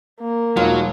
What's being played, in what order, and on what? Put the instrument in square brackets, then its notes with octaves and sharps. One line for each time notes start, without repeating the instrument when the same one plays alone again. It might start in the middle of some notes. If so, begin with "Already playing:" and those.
[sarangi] A#3
[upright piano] E1 D#4 [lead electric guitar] F#3 [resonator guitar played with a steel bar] F4